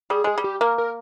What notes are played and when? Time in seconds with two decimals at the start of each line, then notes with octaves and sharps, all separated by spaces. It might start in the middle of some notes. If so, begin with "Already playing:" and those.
0.10 G3 G#4
0.24 G#3 G#4
0.38 G3
0.44 G4
0.61 A#3 A#4
0.78 A#4